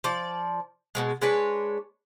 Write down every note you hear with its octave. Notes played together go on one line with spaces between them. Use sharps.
F3 D5
B2 D#3 G#3
G#3 D4 B4 C#5